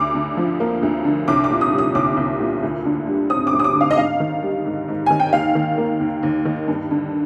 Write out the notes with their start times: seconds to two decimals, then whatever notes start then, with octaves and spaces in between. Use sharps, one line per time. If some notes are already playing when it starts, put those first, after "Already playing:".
Already playing: D2 D6
0.15 D3
0.37 F3
0.60 A#3
0.83 D2
1.05 D3
1.28 C2 D6
1.44 D6
1.50 A#2
1.61 D#6
1.73 G3
1.78 D#6
1.95 C2 D6
2.17 C2
2.40 A#2
2.63 D2
2.85 D3
3.07 G3
3.30 C4 D#6
3.47 D6
3.53 D2
3.59 D#6
3.64 D6
3.75 D3
3.81 F5
3.91 D#5
3.98 G#2 F5
4.20 D#3
4.42 G3
4.65 G#2
4.88 G#2
5.06 D#3 G#5
5.20 G5
5.33 D#2 F5
5.55 D#3
5.78 A#3
6.00 D#2
6.23 D#2
6.45 D#3
6.68 G2
6.91 D3